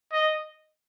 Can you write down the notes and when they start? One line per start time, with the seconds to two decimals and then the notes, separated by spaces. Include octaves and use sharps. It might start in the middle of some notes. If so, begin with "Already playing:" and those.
0.13 D#5